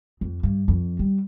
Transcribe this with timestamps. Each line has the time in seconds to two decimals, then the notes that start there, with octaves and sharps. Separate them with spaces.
0.21 F2
0.43 G2
0.68 F2
0.99 G3